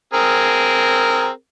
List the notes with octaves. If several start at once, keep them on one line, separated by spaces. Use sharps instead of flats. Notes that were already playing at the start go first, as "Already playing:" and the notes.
C4 G#4 A#4